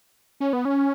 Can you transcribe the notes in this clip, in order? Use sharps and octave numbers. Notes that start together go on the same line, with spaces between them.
C#4
B3
C#4